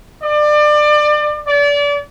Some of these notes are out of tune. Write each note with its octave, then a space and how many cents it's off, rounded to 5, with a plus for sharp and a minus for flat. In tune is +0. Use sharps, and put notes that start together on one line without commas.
D5 +30
D5 -30